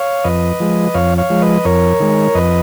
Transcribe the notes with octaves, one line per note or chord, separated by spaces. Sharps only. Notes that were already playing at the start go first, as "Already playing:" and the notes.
Already playing: C#5 F5
F2 B4 D#5
F3 G#3
F2 C#5 F5
C#5 F5
F3 G#3
B4 D#5
F2 A#4 C#5
D#3 G#3
F2 B4 D#5